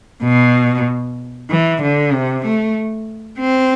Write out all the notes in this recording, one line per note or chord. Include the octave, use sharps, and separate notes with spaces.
B2
E3
D3
C3
A3
C4